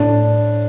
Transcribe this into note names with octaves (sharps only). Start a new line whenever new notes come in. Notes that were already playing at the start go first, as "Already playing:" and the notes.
Already playing: A2 D4